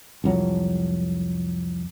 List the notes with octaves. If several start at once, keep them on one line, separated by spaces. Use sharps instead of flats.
C2 F2 F#3